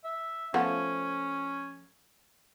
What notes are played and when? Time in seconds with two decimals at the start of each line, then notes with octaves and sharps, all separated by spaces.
0.04 E5
0.54 F3 A3 B3 C#4